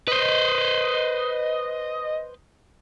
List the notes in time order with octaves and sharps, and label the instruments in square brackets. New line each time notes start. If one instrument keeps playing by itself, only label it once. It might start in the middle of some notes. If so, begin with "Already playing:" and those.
[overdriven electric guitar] B4 C5 [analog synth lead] D#5